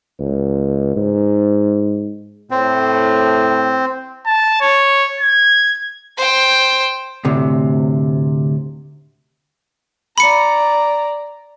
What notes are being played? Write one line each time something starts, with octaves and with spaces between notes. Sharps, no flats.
C#2
G#2
A2 C4
A5
C#5
G#6
C5 G5
D2 A2 C3
D5 A#5 B5 C#7